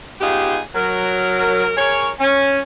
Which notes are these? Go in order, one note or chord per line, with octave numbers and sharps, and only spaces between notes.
B3 D#4 F4 G4 G#4
F#3 A#4
G#4 A#4 C#5
C#4